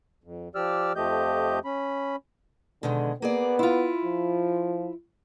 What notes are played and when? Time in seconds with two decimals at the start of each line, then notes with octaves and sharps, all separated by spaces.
0.24 F2
0.55 F3 G4 D5 E6 F6
0.96 F2 F3 A3 G4 D#5 G6
1.65 C#4 B5
2.83 B2 D3 D#3 G#3
3.22 A#3 B3 G#4 D5
3.59 E4 F4
4.05 F3